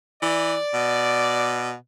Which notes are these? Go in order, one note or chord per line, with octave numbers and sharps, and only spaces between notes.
E3 D5
B2